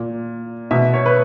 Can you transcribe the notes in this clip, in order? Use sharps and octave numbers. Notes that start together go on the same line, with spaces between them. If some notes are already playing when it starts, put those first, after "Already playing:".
Already playing: A#2
B2 E5
C#5
B4